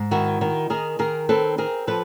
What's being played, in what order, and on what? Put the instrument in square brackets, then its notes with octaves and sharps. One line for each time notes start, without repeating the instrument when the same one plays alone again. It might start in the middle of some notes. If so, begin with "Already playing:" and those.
Already playing: [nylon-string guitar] G#2
D#3 E4 F#4
D#3
D#3 G#4 A#4
D#3 G#4 A#4
C4 A4 B4
C4 G#4 A#4
F3 A4 B4